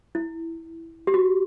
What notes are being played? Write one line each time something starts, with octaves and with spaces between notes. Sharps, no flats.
E4
G4
F#4